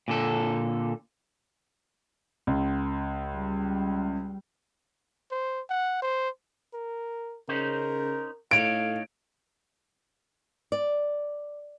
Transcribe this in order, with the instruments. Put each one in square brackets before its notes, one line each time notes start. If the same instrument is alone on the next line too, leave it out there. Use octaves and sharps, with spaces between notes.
[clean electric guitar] A#2 D3 A4
[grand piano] C#2
[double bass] G3
[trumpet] C5
F#5
C5
[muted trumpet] A#4
[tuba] C#3 [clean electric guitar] C#4 D#4 C5 [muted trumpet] A#4
[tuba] A2 [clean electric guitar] D#4 A4 C#5 [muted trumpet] F5 [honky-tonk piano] D7
[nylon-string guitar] D5